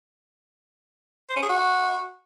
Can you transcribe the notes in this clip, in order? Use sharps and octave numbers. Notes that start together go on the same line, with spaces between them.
C5
C#4
G#4
F#4